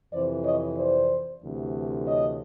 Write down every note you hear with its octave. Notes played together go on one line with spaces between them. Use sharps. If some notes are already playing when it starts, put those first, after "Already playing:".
F2 C3 E3 C5 D5
C#5 D#5
C5 D5
D2 C3 E3
C#5 D#5